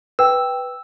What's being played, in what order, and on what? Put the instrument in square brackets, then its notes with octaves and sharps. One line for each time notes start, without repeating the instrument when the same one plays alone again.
[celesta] B4 G5 [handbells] E6